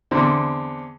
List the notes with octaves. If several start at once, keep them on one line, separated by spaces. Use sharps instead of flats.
E2 D3 C4